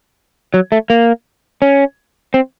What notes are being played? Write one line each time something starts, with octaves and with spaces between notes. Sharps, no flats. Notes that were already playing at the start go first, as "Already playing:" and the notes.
F#3
A3
A#3
C#4
C4